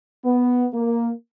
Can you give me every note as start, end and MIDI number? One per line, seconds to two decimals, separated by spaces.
0.25 0.65 59
0.73 1.10 58